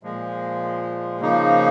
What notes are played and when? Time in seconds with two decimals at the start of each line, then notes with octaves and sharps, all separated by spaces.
0.03 A#2 F3 G#3
1.20 C#3 F3 A#3 D#4